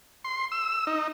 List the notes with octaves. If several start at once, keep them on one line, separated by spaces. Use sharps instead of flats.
C6
E6
D#4